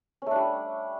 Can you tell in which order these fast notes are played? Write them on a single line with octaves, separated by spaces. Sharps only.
C#4 A3 D4 G3